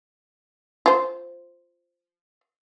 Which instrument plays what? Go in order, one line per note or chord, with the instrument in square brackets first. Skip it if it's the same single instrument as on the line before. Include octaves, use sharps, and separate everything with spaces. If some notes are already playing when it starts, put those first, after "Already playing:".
[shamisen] F4 C5